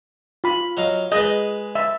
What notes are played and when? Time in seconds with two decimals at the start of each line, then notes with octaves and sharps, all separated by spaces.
0.44 F4 B5
0.77 F#3 D#5 F5
1.12 G#3 B4 D#5
1.75 E5